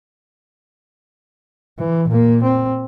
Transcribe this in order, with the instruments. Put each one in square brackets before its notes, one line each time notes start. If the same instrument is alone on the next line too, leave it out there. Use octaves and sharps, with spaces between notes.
[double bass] E3
A#2 A#3
C4